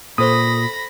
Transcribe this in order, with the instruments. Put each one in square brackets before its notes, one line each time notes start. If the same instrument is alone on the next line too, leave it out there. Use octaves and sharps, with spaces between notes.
[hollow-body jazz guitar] A#2 [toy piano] A4 C5 C#6 [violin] B5 A#6 [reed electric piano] D#6